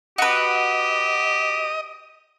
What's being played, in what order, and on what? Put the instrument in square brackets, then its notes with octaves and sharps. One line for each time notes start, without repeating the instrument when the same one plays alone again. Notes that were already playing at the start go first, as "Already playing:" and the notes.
[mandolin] F#4 B4 [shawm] G4 [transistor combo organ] D#5